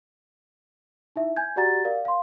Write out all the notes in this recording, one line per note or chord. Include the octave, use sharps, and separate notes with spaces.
D#4 E4 E5
G#5 G6 G#6
F#4 G4 D5 F#5 A#5 A6
A#4 D5 F5
F5 C6